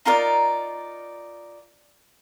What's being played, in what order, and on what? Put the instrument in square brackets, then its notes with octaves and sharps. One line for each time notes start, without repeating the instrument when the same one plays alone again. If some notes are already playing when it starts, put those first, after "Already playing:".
[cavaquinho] D#4 F4 A#4 D5